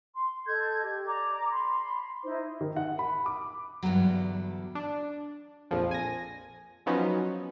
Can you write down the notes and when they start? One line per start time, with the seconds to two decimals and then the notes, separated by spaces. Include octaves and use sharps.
0.13 C6
0.46 A4 D#5 G6 G#6
0.82 G4
1.06 D5 A#5 D6
1.51 B5 C6
2.23 D#4 E4 C5
2.61 D#3
2.76 F#5
2.99 B5
3.26 D6
3.83 E2 G2 B2 D3 F#3
4.75 D4
5.71 A#1 F2 F3
5.91 G#5 A#6
6.86 F3 F#3 B3 C#4 D#4